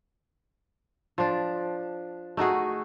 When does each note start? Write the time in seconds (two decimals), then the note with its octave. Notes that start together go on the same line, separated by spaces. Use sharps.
1.18 F3 D4
2.37 A3 D#4 F#4 G#4